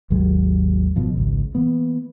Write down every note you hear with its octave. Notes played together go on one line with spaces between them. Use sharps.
G#1 D#2 F#3 G#3
G#1 B2 F3
G#1 C#2
E3 A#3 B3